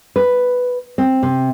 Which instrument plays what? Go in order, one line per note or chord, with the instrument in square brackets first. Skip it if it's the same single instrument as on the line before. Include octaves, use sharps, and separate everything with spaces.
[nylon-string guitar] B4
C4
C3